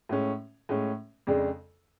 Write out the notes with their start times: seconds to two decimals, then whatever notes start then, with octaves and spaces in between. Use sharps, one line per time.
0.09 A2 G#3 C#4
0.69 A2 G#3 C#4
1.27 F2 C#3 G#3 D4